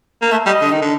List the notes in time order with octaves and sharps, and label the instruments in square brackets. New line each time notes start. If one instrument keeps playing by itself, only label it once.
[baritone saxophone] A#3
[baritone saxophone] A3 [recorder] E5
[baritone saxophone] G3 [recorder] D#5
[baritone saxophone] D3
D#3
D3